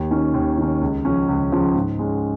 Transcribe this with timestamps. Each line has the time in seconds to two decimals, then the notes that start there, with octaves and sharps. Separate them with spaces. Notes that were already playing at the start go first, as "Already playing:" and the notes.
Already playing: D#2
0.11 D#3 C#4
0.34 D#2
0.58 D#3 C#4
0.81 C#2
1.05 C#3 F3 C#4
1.28 C#2
1.52 C#3 F3 C#4
1.75 G#2
1.99 G#3 C#4